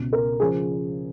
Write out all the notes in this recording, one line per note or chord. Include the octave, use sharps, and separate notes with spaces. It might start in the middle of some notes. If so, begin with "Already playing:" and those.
Already playing: C#2 B2
A#4
C#3 F3 G#4